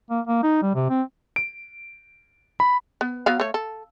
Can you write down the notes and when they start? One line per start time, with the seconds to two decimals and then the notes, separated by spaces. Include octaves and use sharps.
0.10 A#3
0.27 A#3
0.43 D#4
0.62 G3
0.75 C3
0.90 C4
1.36 D7
2.60 B5
3.01 B3
3.26 F#3 B3 F5
3.40 A3 C#5
3.54 A4